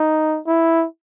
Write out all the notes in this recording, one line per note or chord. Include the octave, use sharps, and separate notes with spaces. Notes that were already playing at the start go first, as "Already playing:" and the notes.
Already playing: D#4
E4